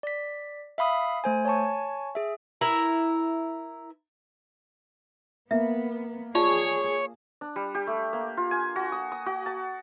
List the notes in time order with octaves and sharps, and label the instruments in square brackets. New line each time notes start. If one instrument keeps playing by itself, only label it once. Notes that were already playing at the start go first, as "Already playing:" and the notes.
[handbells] D5 B6
E5 F5 B5 D#6
A3 C5 G#5
C#5 G#5 A5 C#6
G#4 E5
[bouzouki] E4 A#4 E5
[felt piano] A#3 [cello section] B3 [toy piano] E5
[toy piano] F4 D5 A5 [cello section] G#4 [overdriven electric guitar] C#5
[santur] D4
G3
G4
A3
A#3
F4
G#5
F#4
D#6
D#6
F#4
A5